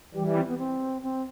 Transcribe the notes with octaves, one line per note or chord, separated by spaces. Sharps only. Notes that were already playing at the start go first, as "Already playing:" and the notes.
E3 G3 G4
E4
C4
B3
C4
C4